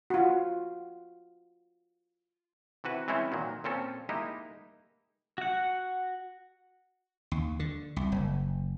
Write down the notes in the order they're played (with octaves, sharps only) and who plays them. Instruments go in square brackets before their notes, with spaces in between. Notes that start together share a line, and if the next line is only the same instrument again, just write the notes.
[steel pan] F4 F#4
[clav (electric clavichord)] C3 E3 F#4 B4
E3 G#3 C4 C#4 E4 C5
A#2 D#3 F#3
A#2 C4 C#4 A4
G#3 A#3 D#4 E4 G4
[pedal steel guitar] F#4 F#5
[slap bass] D#2
D3
C2
F#1